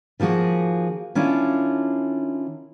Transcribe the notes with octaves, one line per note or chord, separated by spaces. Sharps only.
D#3 F3 A#3 F#4 G#4
D#3 C#4 D4 E4 F4